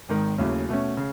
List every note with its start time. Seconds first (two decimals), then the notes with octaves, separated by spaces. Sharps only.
0.09 G#1 G#2 D#3
0.38 D#2 C#3 F#3 A3 E4
0.69 B2 A3 C#4
0.97 C#3